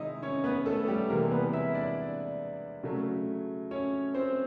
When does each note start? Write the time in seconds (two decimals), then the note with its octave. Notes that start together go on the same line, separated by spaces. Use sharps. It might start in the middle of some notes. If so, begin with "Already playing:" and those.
Already playing: C3 D#3 G#3 D#4 E4 D#5 E5
0.22 C#4 C#5
0.44 B3 B4
0.66 A3 A4
0.88 G3 G4
1.09 C3 E3 G#3 A#3 A#4
1.32 B3 B4
1.53 E4 E5
1.74 D4 D5
2.83 C#3 F#3 A3
3.71 C#4 C#5
4.14 C4 C5